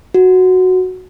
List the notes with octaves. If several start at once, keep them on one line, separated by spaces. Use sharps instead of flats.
F#4